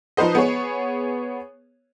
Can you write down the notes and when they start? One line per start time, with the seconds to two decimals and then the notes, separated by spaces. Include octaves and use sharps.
0.17 F3 D#4 B4 C5 D#5
0.35 B3 G#4 C#5